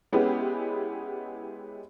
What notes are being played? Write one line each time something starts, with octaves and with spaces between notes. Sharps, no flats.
G#3 B3 C#4 E4 G4 G#4